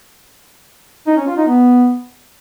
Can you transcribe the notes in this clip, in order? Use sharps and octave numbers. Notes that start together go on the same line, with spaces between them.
D#4
C#4
F4
D#4
B3